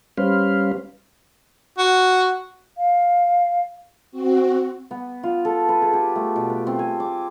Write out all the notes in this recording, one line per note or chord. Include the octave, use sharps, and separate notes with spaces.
G3 C#4 B4 C5 F5
F#4
F5
C4 F#4
B3
F4
A4
B4
G#4
G4
A3
B2
B4
C4
G#5
D6